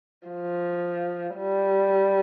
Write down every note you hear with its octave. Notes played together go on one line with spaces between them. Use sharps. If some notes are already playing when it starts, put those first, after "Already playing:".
F3
G3